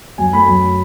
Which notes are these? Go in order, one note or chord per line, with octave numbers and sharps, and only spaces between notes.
F#2 G#5
A3 B5
F#2